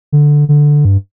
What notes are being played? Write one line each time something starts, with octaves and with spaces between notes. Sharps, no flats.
D3
D3
G2